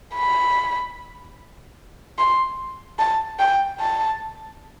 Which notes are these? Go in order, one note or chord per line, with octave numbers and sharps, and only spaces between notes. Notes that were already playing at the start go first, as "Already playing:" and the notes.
B5
C6
A5
G5
A5